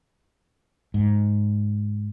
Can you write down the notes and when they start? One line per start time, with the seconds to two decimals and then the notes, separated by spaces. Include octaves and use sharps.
0.94 G#2